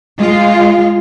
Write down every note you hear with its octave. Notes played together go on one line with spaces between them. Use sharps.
G#3 F4